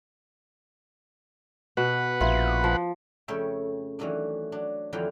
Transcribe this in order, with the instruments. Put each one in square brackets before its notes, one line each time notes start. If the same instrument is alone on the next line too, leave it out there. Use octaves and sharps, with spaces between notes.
[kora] B2 [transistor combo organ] B4 F#5
[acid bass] A#1 [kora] E4 F4
[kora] F3
[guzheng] F2 C#3 A3 C#5 E5 G5
D#3 E3 F#3 A3 D4
F#3 D4
F2 D3 E3 F#3 F4 G5